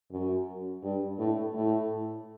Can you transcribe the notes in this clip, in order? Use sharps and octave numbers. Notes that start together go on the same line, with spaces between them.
F#2
G2
A2
A2